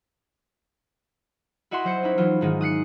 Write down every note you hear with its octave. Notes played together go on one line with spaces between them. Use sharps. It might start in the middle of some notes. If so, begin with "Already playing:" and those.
E4 F#4 D#5 E5 F#5 C6
F#3 C5 C#7
C#4 D#4 E4
E3 F#3 F4
G#2 D#3 G#3
D#6 F#6 C7 C#7